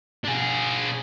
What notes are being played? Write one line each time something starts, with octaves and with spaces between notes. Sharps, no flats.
D4 G#4